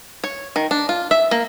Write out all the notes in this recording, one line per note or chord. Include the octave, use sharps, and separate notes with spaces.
C#5
D#3
D4
F4
E5
A#3